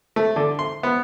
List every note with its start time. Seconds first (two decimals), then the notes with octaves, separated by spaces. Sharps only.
0.16 A3
0.36 D3
0.59 C6
0.83 B3